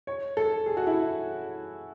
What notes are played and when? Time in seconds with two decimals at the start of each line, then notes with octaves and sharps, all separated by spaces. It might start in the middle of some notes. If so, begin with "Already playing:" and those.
0.07 C#5
0.37 A4
0.66 G#4
0.77 F#4
0.87 E4